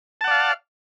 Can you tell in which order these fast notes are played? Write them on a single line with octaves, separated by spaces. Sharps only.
A5 F#5 D5 F5